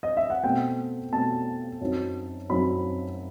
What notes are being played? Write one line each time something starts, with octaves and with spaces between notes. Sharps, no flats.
D#5
E5
F#5
B2 A3 C4 G5
B2 A3 C4 A5
F#2 F#3 C4 D#4
F#2 F#3 C4 D#4 B5